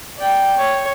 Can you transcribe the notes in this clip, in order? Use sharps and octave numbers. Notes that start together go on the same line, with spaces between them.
D5 G5
C#5